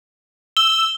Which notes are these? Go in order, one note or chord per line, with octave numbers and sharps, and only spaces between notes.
E6 G7